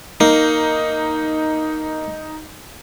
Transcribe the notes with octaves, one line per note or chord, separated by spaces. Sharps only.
A#3 D#4